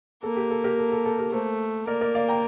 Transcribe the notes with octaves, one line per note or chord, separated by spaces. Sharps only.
A#3 A4
G4
A4
G4 A#4
A4
A4
A4
G4 A#4
A3 A4 C5
A#3 A#4 D5
A#4 D5
D5 F5
G5 A#5